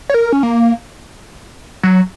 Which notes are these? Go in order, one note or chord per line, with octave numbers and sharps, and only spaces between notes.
C#5
A#4
C#4
A#3
F#3